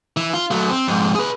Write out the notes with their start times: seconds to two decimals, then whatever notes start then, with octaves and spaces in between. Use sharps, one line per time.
0.17 E3
0.34 F4
0.51 F#3 A3
0.70 C4
0.88 F2 G#2
1.15 G#4 B4